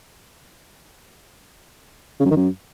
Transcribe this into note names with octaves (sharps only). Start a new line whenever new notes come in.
C#3
F#2
D#3
F#2